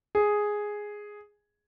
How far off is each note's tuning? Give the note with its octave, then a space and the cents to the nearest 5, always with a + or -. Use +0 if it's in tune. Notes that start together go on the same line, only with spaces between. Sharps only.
G#4 +0